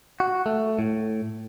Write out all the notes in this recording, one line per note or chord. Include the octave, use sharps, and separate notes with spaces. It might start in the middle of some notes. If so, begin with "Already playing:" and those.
F#4
A3
A2